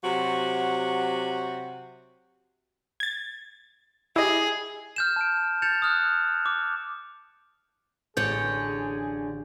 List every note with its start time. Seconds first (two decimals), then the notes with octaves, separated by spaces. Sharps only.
0.02 C3 F#3 F#4
3.00 G#6 A6
4.16 E4 G4 G#4 D#5
4.96 F6 G6 E7
5.16 A5 D7
5.62 G6 A6 C#7 E7 F7
5.82 D#6 F6 F#6
6.46 D6
8.17 A1 D3 G#4 C#5 G6